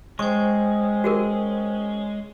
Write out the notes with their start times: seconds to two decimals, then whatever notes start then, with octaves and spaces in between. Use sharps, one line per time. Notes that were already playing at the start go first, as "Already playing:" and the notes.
0.19 G#3 C#4 C5 G5 C#6
1.04 F#4 G#4 A#4